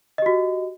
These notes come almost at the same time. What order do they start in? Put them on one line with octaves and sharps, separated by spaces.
D#5 G4 F#4